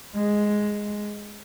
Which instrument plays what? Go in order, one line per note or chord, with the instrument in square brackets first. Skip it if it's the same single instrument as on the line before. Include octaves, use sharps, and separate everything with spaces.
[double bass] G#3